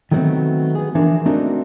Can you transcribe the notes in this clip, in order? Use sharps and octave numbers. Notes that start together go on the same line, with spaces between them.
D#3 F#3 A3 B3 C4
B3 G#4
E3 F3 D4 G#4 A#4
A3 C4 D4 D#4 F#4 A#4